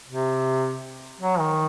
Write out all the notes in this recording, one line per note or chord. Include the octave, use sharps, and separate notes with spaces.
C3
F#3
D#3